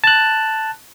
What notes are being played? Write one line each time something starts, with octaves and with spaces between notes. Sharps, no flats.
A5 F#6